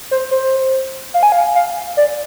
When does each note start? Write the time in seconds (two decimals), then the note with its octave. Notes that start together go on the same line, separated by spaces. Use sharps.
0.11 C5
0.31 C5
1.14 F5
1.23 G#5
1.32 F5
1.55 F5
1.97 D5